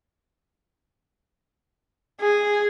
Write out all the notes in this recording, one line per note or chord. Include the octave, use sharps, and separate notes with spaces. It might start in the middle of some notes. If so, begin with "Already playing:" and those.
G#4